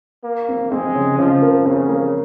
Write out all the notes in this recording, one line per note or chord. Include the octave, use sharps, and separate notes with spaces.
A#3
C4
G#3 C4
C#3 C#4
C#3 F3 C#4
A#3 A#4
C#3 C4 C5
A#3 A#4